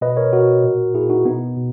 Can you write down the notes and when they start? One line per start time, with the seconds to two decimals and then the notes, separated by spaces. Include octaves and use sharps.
0.01 B2 B4 D#5
0.17 A#4 C#5
0.33 B2 F#4 A#4
0.64 A#2
0.94 A#2 E4 G#4
1.10 D#4 F#4
1.25 B2 B3 D#4
1.57 B2